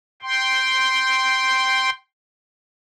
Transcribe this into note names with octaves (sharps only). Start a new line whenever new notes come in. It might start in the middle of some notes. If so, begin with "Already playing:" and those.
G5 C6